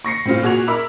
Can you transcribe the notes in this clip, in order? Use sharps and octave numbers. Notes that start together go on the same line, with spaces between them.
C#6 A#6 C7 C#7
A2 C4 F4
A#2 F#4 G#4 C#6 G#6 F7
A#4 E5 B5 D6 E6